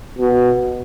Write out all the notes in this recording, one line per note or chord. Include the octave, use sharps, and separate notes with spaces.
B2